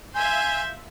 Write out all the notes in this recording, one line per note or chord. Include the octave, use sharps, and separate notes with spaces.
E5 F5 G#5 C6 G6